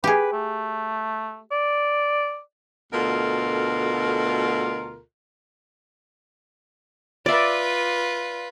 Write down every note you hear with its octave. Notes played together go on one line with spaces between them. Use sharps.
G4 G#4 B4
A3
D5
D2 B2 A3 F4 A4 A#4
F4 B4 D5 E5